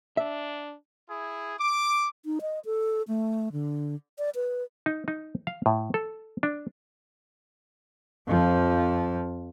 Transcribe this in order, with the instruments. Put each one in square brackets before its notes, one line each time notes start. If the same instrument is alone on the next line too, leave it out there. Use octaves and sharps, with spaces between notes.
[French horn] D4 [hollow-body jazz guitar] E5
[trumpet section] E4 G#4
D6
[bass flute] D#4
D#5
A4
A3
D3
D5
B4
[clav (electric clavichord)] D#4
D#4
F5
A2
A4
D4
[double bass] F2 F3